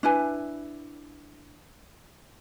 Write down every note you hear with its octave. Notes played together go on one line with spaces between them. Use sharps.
D4 E4 B4 G#5